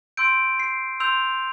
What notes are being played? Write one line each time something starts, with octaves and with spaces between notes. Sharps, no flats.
C6 E6 G6 D7
C7
C6 E6 G6 F7